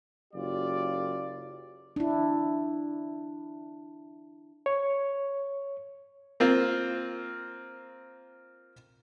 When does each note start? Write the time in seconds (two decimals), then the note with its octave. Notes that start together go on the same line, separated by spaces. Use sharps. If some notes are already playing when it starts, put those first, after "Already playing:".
0.34 F#1 F#2 F#3 F4 G4 D5
1.96 D4 E4
4.66 C#5
6.40 A#3 C4 F4